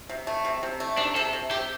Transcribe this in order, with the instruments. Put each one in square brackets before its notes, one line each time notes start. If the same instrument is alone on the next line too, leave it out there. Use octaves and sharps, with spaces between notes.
[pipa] C3
A3
C3
C3
A3
[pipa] C3 [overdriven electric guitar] D4
[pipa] C3 [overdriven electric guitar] A4
[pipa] C3
[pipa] C3 [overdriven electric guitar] G4